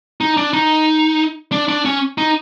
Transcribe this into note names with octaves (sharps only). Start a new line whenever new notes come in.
D#4
D4
D#4
D4
D4
C#4
D#4